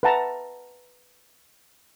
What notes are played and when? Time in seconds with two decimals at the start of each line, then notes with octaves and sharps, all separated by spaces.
0.03 B4 E5 F#5 A5 A#5